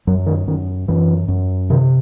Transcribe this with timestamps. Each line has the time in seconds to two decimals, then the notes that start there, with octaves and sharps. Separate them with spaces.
0.07 F#2 F#3
0.27 D#3
0.48 F#2 D#3
0.88 F#2 E3
1.28 F#2
1.70 C3 D#3